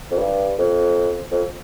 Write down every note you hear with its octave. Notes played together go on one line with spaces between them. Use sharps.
F2
G2
F2
F2